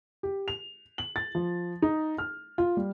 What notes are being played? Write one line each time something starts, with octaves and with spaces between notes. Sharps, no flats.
G4
F7
F#7
A6
F3
D#4
F6
F4
G3